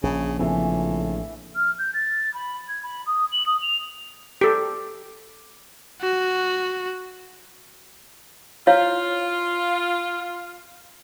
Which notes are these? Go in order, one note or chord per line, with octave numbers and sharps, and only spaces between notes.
A#1 C#3
A2 C#3 E3 F3 C4 E4 G#5
F6
G6
A6
B5
G#6
B5
D#6
F#7
D#6
F7
G4 A4
F#4
E4 F4 C#5 F5